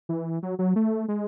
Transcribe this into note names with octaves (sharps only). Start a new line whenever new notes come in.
E3
F#3
F#3
A3
G#3